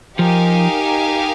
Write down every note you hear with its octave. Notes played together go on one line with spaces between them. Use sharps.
F3 D#4 G4 A#4 F5 G#5